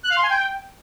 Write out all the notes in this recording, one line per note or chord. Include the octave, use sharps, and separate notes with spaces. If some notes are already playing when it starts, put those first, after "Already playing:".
F#6
F5
C6
G#5
G5